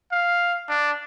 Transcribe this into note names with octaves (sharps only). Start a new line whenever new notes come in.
F5
D4